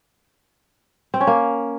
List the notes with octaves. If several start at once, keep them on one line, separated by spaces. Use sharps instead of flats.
C4
C#4
A#3